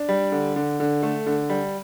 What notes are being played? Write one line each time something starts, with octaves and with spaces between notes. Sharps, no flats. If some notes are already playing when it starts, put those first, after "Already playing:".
Already playing: D4
G3
D3
D3
D3
A3
D3
G3